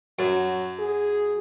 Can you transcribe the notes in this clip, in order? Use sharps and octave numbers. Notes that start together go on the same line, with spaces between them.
F#2 F#3
G#4